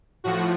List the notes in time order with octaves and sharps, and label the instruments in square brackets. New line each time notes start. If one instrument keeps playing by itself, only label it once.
[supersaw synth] A2 F3 F#4